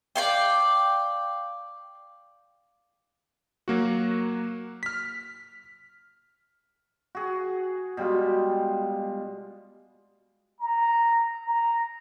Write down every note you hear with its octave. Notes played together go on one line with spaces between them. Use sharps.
D5 F5 G5
F#3 A#3 F#4
F6 B6
F#4 G#4
B2 G3 G#3 F4
A#5
A#5